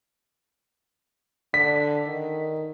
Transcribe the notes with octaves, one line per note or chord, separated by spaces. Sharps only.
D3 B6
D#3